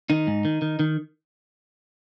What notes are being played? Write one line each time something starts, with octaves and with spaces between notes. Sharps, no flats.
D#3 D#4
G#2
D#3
D#3
D#3